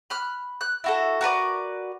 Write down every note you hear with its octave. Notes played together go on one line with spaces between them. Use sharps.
B5 F6 F#6
F#6
E4 F#4 A4
F#4 A#4 B4 D5